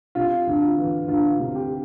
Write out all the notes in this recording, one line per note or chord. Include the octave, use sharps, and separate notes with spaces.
C3 F4
D2
F4
E3
D2 F4
C3
G4